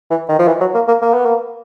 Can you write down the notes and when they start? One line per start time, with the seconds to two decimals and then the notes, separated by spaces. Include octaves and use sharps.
0.10 E3
0.29 D#3
0.39 F3
0.48 E3
0.61 F#3
0.74 A#3
0.88 A#3
1.02 A#3
1.14 B3
1.25 A#3